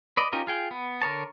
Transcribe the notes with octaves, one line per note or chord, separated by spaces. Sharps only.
B4 D5 D#5
C#4 D#4 F4 G4 A#4
F4 G#4 G5
B3
D3 A#4 C#5 A5